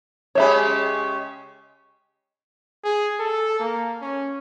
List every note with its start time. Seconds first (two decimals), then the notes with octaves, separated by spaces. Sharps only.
0.35 C#3 G#3 G4 C#5 E5 B5
2.85 G#4
3.20 A4
3.60 A#3
4.02 C#4